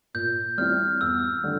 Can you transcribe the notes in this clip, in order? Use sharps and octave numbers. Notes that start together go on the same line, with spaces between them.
A#2 G6
G3 C4 E4 F6
E2 E6
D3 G3